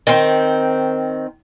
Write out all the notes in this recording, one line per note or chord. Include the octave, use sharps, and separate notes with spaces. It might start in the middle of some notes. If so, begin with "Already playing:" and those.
D#3 C4